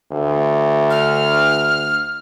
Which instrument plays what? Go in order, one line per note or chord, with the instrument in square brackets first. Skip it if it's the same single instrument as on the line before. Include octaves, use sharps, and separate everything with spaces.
[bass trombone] D2
[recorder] F6